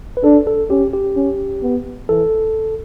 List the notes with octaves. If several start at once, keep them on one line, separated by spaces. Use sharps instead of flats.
B4
D4 A4
A4
C#4 G4
G4
C#4
B3
E3 A4